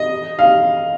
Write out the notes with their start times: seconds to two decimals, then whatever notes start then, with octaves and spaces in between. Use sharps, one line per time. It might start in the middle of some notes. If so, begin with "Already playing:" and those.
Already playing: D#5
0.39 F5